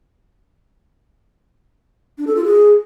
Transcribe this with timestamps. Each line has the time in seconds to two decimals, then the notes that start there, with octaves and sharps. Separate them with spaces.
2.18 D4
2.27 A4
2.36 F4
2.45 G#4